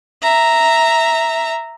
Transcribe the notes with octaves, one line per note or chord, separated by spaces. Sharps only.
E5 A#5